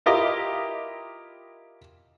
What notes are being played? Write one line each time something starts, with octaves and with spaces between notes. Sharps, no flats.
E4 F4 G4 A#4 D#5